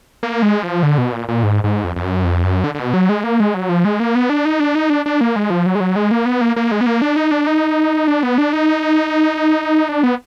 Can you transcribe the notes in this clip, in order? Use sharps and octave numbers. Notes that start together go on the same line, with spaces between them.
A#3
G#3
F3
D3
B2
A#2
A#2
G#2
G#2
F2
F2
F#2
F2
F#2
D3
D3
B2
F#3
G#3
A#3
G#3
F#3
F3
G#3
A#3
B3
D4
D#4
D4
D#4
D4
D4
A#3
G#3
F3
F#3
G#3
F#3
G#3
A#3
B3
A#3
A#3
G#3
B3
A#3
D4
D#4
D4
D#4
D4
B3
D4
D#4
D4
B3